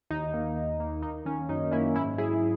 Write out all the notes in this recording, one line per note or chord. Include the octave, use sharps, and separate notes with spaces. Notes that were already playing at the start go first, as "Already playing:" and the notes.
D#2 D#4
A#3
A#3
A#3
A#3 D#4
D#3 C#4
F#2 D#4
A#3 C#4 E4
G#2 C#4 E4
F#3 E4 G#4